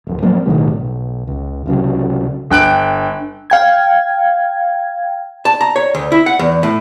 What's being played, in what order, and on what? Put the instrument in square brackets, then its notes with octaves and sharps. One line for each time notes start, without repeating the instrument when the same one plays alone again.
[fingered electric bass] D1 F2
F3 F#3 A#3 C4
B1 A2 D#3 G3
B1
C#2
C2 C#3 F#3
[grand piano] G1 G5 F#6 D7
[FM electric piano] F5 G5 G#6
[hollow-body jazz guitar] A5
A#5
C#5
D2
E4
F#5
E2
A2